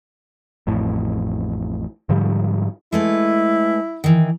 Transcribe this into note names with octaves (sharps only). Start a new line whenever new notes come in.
A1 F2 A2
G#2 D3 F3 G3
G#3 A3 E4 B4
D#3 E3